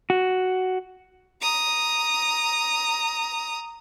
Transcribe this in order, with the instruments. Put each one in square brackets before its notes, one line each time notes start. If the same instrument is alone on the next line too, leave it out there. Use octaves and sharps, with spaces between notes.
[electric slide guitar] F#4
[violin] A#5 D#6